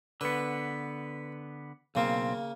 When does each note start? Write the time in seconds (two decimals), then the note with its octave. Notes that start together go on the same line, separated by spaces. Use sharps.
0.21 D3 B3 B4
1.95 B1 C#3 A#3 C4